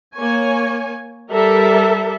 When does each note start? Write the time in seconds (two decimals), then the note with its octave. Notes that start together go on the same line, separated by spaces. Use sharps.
0.15 A#3 C#5 G#5
1.31 G3 A4 A#4 E5